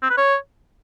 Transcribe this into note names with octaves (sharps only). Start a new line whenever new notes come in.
C4
B4
C#5